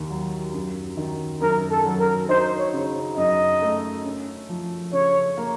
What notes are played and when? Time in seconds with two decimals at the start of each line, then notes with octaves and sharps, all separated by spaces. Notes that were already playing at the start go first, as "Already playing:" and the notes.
Already playing: D#2 D#3
0.10 F#3
0.54 F#2
0.97 D#3
1.41 F#2 A#4
1.70 A4
1.86 F#3
2.00 A#4
2.29 D#4 C5
2.58 C#5
2.73 C#3
3.17 F#2 D#5
3.62 A3
4.05 C#4
4.49 F3
4.93 C#3 C#5
5.37 A#3